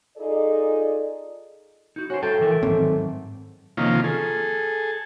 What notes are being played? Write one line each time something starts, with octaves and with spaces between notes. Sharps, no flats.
D#4 F4 G#4 A4 D5
D#4 F#4
C#4 F#4 C5
G2 A3 G5 A5
E3 A4 A#4
G#2 D#3 F#3 C4
C3 D#3 F3 A#3 C#4 F4
G#4 A4